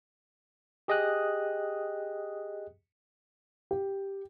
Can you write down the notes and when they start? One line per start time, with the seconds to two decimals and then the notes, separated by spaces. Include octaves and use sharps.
0.88 G4 G#4 D#5 G5 D#6 F#6
3.71 G4